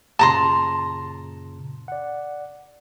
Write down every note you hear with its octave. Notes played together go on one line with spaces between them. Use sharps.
F#2 A#2 C#3 A5 A#5 C6
D5 F#5